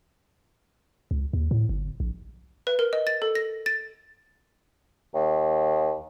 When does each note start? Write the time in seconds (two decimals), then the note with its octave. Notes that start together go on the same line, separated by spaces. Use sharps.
1.11 C#2
1.33 D#2
1.51 A2
1.69 G1
2.00 A#1
2.67 B4
2.79 A#4
2.93 D#5
3.07 A6
3.22 A4
3.35 A#6
3.66 A6
5.14 D#2